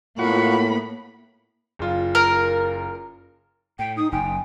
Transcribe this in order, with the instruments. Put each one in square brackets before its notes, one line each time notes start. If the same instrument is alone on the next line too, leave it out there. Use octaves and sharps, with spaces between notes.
[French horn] A2 [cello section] A#3 B3 [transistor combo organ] F4 F#5 C#6 [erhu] B5
[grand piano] F#1 F4
[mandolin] A#4
[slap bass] A2 [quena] G5
[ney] D#4 [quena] D#6
[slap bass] F#1 F#2 [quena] G5 [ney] G#5